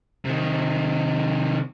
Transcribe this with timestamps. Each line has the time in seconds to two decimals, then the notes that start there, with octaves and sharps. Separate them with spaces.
0.25 C3 D#3